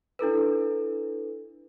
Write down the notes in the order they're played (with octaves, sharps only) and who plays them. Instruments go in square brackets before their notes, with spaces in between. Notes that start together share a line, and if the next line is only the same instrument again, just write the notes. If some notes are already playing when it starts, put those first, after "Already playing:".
[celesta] D4 E4 A4 B4